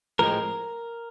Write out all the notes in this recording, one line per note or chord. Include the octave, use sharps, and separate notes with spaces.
A2 F3 G#3 C4 A#4